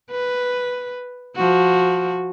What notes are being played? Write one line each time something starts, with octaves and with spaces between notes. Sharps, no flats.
B4
F3 F#4